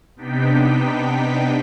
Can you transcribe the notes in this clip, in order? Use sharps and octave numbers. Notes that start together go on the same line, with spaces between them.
C3 B3 D4 D#4 G5 B6